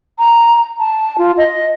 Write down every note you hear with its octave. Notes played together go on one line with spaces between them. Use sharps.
A#5
A5
F4
D#5